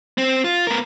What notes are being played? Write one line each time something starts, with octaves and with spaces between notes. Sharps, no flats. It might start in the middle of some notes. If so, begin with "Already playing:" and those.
C4
F4
B3 A#4